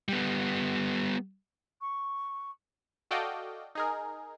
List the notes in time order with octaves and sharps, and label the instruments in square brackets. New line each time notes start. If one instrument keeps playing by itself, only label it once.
[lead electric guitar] G3 B3
[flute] C#6
[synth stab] F#4 A4 D5 D#5 F5 G5
D#4 G#4 A#4